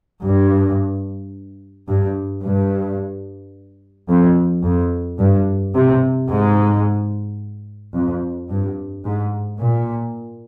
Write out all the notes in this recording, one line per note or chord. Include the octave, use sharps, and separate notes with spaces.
G2
G2
G2
F2
F2
G2
C3
G#2
F2
G2
G#2
A#2